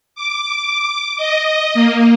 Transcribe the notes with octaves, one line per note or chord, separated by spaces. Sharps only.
D6
D6
D#5
A#3